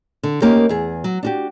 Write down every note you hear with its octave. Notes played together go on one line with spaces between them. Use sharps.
D3
A#3 C#4 D#4 G4 A#4
E2 G#4
F#3
D4 F#4 G4